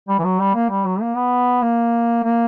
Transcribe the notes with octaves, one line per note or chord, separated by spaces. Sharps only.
G3
E3
F#3
G3
A#3
G3
F#3
A#3
B3
A#3
A#3